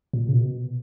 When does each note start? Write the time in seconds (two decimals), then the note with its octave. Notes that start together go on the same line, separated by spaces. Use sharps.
0.13 A#2
0.29 C#3
0.34 B2